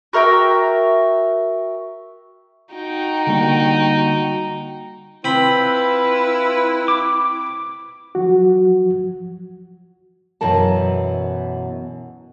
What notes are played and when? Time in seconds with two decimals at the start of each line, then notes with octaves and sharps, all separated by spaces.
0.13 F#4 A#4 E5 G5
2.74 D#4 F#4 G5
3.27 D3 G3 A#3
5.24 C4 E4 F4 B4 B5
6.88 D6
8.15 F3 F#3 F#4
10.41 F#2 B2 E3 A#4 A5